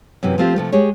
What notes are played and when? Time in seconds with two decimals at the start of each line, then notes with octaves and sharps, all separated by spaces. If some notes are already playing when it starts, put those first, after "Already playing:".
0.23 F#2 C3 E3
0.38 F3 A3 C4 F4 G4
0.56 C3 F3 A3
0.72 G#3 G4 G#4 C#5